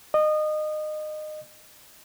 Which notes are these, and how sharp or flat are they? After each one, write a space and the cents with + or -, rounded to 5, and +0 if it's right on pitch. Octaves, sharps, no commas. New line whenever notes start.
D#5 -25